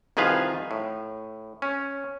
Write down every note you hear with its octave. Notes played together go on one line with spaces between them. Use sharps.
C2 D#3 F3 G#4 B4 F5
A2
C#4